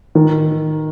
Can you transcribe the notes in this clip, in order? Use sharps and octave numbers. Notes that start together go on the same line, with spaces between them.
D#3